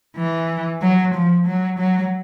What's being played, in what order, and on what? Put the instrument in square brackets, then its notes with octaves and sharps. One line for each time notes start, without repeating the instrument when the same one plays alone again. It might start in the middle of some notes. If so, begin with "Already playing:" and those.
[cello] E3
F#3
F3
F#3
F#3